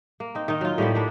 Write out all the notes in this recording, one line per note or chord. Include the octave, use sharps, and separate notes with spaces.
A#3
C4 D#4
D#3 D#4
F#3 F4
A2 G3 A#3 B3
A#3 B3 D4